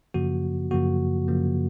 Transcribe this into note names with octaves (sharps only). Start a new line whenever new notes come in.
F#2 C#3 F3 A#3 F#4
F#2 C#3 F3 A#3 F#4
F#2 C#3 F3 A#3